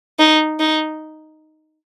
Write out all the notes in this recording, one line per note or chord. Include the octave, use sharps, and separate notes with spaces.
D#4
D#4